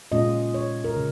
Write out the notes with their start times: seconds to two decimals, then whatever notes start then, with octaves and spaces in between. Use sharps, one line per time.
0.12 A#2 G#3 C#4 F4 D#5
0.54 C#5
0.84 A#4
0.97 C#3